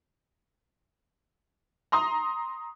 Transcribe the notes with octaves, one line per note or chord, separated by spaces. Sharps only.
A#5 C6 D#6